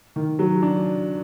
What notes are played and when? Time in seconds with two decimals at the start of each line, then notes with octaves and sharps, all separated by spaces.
0.16 D#3
0.39 F#3
0.62 D4